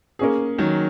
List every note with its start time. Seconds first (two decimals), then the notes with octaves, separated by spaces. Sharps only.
0.19 A#3 C#4 G#4
0.58 D#3 F#3